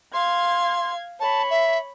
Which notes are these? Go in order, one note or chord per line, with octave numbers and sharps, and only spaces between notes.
F5 C6 G#6
C#5 A5 B5
E5